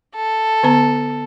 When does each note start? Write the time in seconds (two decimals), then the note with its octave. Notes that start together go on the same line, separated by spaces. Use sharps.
0.15 A4
0.63 D3 B3 A#5